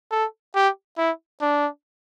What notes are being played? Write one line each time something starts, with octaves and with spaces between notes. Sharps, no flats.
A4
G4
E4
D4